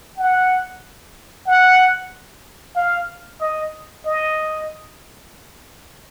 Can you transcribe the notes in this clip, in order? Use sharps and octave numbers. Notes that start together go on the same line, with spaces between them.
F#5
F#5
F5
D#5
D#5